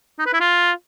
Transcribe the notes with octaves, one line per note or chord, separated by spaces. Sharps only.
D#4
B4
E4
F4